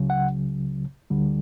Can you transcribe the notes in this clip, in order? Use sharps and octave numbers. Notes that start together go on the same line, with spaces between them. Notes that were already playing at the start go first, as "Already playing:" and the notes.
Already playing: C#2 C#3 F#3
F#5
D2 D3 G3